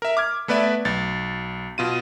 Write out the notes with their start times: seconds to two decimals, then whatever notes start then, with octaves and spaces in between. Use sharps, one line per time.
0.02 A#4 E5
0.17 D6 F6 G#6
0.48 A3 B3 B4 D5 E5
0.85 B1 A6
1.78 B2 F4 D#7